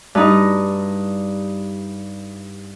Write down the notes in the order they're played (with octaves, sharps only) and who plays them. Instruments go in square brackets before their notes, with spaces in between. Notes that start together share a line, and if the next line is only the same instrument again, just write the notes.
[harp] G2 D#4 D#5